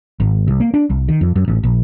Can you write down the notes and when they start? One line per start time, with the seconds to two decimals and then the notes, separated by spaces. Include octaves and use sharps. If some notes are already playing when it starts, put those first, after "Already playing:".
0.20 G#1
0.48 C2
0.60 A#3
0.74 D4
0.90 C2
1.09 D#3
1.21 F2
1.36 F#2
1.48 A1
1.63 A#1